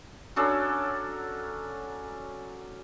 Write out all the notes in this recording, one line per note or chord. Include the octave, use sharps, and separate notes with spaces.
F#3 C#4 D4 A4